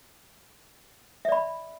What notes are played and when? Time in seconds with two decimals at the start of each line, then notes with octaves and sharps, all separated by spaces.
1.25 E5
1.29 D5
1.32 B5